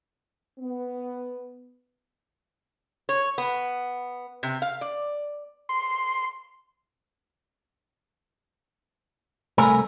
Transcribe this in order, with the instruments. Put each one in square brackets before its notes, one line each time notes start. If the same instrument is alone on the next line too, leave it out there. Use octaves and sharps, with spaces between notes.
[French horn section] B3
[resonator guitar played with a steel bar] C#5
B3
C3
F5
D5
[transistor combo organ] C6
[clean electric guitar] C2 A3 A#4 [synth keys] G#5 A#5 B5